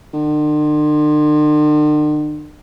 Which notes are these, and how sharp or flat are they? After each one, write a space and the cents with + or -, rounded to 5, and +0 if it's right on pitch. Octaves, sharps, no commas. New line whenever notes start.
D3 +45